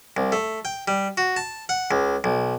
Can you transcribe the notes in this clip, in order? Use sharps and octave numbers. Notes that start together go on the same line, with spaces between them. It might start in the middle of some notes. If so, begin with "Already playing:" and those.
C2
A3
G5
G3
F#4
A5
F#5
C#2
B1